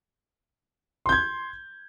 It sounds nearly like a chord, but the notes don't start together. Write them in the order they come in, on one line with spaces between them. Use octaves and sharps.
C6 G6 G#6